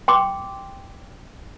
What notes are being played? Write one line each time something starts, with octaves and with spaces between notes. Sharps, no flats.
G5 C6 D6